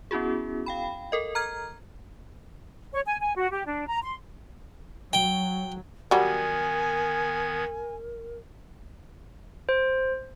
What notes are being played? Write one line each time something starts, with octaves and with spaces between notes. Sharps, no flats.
B3 C#4 E4 F#4 G#4
F5 G5 B5
A4 A#4 D#5
A#5 F6 G#6
C#5
G#5
G#5
F#4
G4
D4
A#5
C6
F#3 G5
D#3 F#3 G3 B3 A#4 G#5 G#6
C5